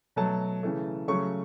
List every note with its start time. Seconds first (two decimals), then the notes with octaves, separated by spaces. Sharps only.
0.16 B2 F#3 A3 A5
0.63 C#3 E3 A3
1.08 C#3 F#3 A3 C#6